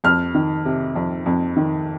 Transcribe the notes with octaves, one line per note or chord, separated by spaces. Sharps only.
F2 F6
D#3
C3
F2
F2
D#3